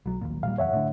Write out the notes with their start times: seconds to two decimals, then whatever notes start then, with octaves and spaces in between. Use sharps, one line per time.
0.06 B1 F#3
0.21 A#1 D#2 A#2
0.43 A#2 F#3 G3 F5
0.58 F#1 E2 C#5 E5 F#5
0.73 A2 D3